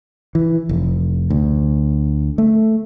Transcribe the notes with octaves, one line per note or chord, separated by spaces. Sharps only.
E3
F1
D2
A3